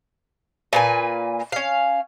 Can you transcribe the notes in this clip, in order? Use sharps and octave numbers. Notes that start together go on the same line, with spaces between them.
A#2 B4 G#5
C#4 F5